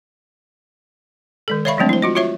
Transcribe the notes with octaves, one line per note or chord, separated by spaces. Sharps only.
D#3 G#3 A4
C#5 D5 E5 F5 B5 C#6
F3 F#3 G#3 A3 C4 D4
E4 C5
F4 F#4 D#5
F4 F#4 C#5 E5 C#6